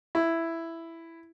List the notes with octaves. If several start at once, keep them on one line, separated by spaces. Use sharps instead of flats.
E4